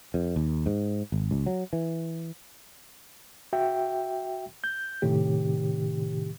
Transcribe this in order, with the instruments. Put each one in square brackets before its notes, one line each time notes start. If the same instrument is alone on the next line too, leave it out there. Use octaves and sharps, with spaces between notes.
[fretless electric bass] F2
D#2
G#2
G#1
C#2
F#3
E3
[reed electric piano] F#4 E5 G5
G6
A2 C3 D#3 G4